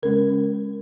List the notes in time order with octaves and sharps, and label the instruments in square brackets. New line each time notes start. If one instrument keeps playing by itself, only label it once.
[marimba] C#3 G#3 C#4 A#4